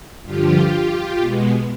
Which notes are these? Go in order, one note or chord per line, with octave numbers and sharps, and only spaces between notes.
G2 D3 F3 F4 G4
B2 G#3 B3